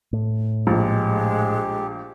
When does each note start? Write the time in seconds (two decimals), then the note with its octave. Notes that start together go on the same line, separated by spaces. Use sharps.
0.13 A2
0.67 A#1 G#3 G4